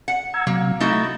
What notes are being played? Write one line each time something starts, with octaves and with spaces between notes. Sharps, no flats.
F#5
A#5 E6 G#6
C3 F#3 A#3
A3 D#4 E4 F#4 A6